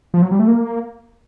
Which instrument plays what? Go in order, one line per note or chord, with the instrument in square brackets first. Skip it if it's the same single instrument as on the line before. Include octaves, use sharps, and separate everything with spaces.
[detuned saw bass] F3
F#3
G3
A3
A#3